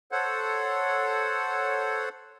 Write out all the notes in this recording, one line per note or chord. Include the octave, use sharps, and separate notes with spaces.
A4 C5 C#5 F#5